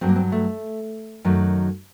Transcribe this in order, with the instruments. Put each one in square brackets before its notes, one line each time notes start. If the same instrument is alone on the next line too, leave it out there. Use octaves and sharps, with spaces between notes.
[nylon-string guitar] G2 F#3 A3 C4
A#3
C4
A3
F#2 D#3 F#3 A3